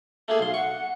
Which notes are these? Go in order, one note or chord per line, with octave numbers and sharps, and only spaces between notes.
A3 A#3 G#4 A4
B1 F5 C6
F#5 C#6